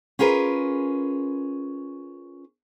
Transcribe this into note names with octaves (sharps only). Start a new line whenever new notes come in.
C#4 F4 G#4 A#4 B4